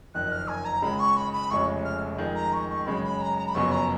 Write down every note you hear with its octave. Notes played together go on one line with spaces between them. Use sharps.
F#1 F2 D#3 F#6
F6
G#5
A#5
C#2 C#3 G#3 B5
C#6
B5
B5
F1 F2 C#3 G#3 C#4 C#6
F6
F2 D#3 G#3
A#5
C#6
C#6
F#2 C#3 G#3 B5
B5
A#5
A#5
B5
F#1 F2 C#3 F#3 B3 C#6
A#5